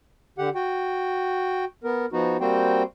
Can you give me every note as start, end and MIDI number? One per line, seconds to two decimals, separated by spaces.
0.38 0.49 50
0.38 0.49 67
0.38 0.49 78
0.55 1.65 66
0.55 1.65 79
1.84 2.06 59
1.84 2.06 70
2.13 2.37 53
2.13 2.37 59
2.13 2.37 63
2.13 2.37 66
2.40 2.83 55
2.40 2.83 58
2.40 2.83 60
2.40 2.83 66
2.40 2.83 72
2.40 2.83 79